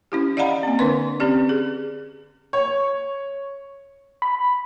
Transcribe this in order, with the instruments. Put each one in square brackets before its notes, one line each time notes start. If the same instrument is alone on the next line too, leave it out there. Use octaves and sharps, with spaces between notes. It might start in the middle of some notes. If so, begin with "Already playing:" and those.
[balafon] C#4 E4 G4
D5 D#5 F5 F#5 A#5 B5
A#3 C4
D3 D4 A#4 B4 C6
C4 C#4 G4 D5
G#4
[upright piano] C#5
[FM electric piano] B5